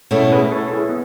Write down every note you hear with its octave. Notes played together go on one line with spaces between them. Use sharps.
B2 A3 C#4 E4 A4 C#5
G#4 B4
A4 C#5
A4
E4 G#4
B3